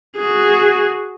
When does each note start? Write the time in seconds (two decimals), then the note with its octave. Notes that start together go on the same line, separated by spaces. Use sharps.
0.16 F#4 G#4